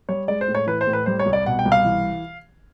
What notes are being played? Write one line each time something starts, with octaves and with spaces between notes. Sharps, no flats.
G3 C#5
G#3 D5
C5
A2
C#5
E3 B4
C5
A2
B4
G3 C5
C#5
C2
D5
B2 F#5
G5
C2
F5
E3